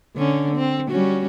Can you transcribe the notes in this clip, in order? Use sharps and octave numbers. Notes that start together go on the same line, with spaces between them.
D3 C#4
C4
G3 C#4 F#4